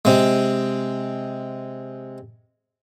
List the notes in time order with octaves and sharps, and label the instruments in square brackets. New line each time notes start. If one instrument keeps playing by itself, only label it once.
[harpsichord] C3 G#3